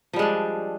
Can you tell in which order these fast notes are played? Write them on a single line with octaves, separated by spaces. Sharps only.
F3 G3 G#3 D4